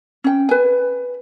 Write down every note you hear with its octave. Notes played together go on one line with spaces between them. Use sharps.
C#4 G5
B4 G#5